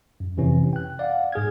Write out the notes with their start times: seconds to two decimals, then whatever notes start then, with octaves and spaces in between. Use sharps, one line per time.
0.20 F#2
0.37 F2 C3 E3 C#4
0.73 G5 F#6
0.99 D5 F5 F#5
1.32 G#2 G#4 F6 G#6